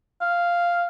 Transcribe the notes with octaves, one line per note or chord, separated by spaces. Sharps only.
F5